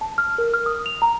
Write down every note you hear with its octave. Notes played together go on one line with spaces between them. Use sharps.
A5
F6
A#4
F6
D#6
F7
A#5